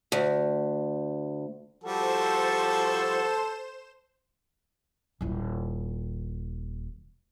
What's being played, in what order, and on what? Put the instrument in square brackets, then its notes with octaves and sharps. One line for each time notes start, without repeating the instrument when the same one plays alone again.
[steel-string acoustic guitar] D2
[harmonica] F3 G3 F#4 [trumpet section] A4 [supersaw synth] C5 E7
[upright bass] D#1 E4